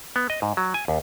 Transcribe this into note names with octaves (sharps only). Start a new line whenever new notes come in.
B3
D#5
G#2
F#3
G#5
D#2